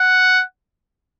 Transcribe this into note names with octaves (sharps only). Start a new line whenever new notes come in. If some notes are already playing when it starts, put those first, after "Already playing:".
Already playing: F#5